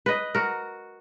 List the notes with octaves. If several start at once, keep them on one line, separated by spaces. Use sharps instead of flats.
B4 D#5
F#4 A#4